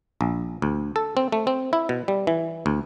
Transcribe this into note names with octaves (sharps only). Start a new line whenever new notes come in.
A#1
D2
A4
C4
A3
C4
E4
B2
G3
E3
D2